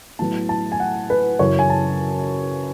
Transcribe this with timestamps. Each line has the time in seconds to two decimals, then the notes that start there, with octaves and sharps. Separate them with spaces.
0.19 A2 F#3 B3 A5
0.49 A5
0.72 G#5
0.80 F#5
1.10 B4
1.39 F#2 C#3 E3 C#5
1.59 G#5
1.70 A5